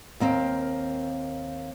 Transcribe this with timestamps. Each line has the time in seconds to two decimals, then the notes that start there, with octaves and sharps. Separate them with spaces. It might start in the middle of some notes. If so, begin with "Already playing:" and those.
0.20 D#2 A#3 C4 F5